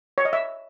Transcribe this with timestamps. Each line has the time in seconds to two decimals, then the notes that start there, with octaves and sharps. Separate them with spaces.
0.18 C#5
0.25 D#5
0.33 E5